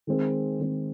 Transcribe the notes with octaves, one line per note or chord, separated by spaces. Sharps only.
D#3 G#3 C4
D#3 G#3 C4